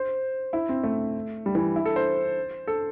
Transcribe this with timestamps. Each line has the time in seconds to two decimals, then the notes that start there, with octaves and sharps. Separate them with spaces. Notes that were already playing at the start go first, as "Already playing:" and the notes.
Already playing: C5
0.53 E4
0.69 C4
0.84 A3
1.46 G3
1.55 E3
1.76 E4
1.86 A4
1.96 C5
2.67 A4